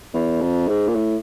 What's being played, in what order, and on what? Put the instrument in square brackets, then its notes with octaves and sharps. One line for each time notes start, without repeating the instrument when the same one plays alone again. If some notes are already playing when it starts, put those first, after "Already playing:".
[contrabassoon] E2
F2
G#2
A#2
A2